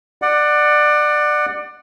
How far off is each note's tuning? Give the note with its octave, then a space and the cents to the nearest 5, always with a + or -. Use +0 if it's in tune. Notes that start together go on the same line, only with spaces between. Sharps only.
D5 +25 F#5 +0